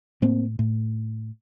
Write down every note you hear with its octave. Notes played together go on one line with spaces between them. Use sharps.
A2 A#3 C4
A2